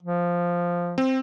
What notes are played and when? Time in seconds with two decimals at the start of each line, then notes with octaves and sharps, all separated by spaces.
0.03 F3
0.98 C4